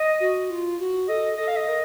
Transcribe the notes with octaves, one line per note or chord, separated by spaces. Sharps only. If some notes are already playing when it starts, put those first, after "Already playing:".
Already playing: D#5
F#4
F4
F#4
A4 D#5
A4 D#5
F5
D#5
A#4 D#5